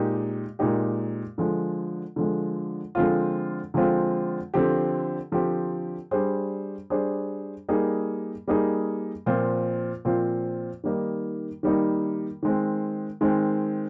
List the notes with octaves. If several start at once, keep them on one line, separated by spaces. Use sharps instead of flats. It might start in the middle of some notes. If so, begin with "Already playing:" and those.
Already playing: A#2 G#3 D#4 G4
A#2 G#3 D#4 G4
D3 F3 G#3
D3 F3 G#3
D3 F3 G#3 C4 F4
D3 F3 G#3 C4 F4
D3 F3 C4 G4
D3 F3 C4 G4
G3 D4 G#4 C5
G3 D4 G#4 C5
G3 A#3 D#4 G#4
G3 A#3 D#4 G#4
A#2 F3 C4 F4 C5
A#2 F3 C4 F4 C5
D#3 G3 A#3 D#4
D#3 G3 A#3 D#4
D#3 G#3 C4
D#3 G#3 C4